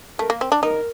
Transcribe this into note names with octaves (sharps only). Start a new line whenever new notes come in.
A3 A#4
A#3
C4
D4
D#4 A#4